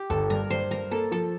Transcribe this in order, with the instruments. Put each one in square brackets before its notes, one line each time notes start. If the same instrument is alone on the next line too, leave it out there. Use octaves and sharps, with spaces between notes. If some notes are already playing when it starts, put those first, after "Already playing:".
Already playing: [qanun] G4
[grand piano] G1 [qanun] A4
[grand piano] G2 [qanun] A#4
[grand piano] G2 [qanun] C5
[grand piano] G2 [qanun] A#4
[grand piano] A#3 [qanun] A4
[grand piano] F3 [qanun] A4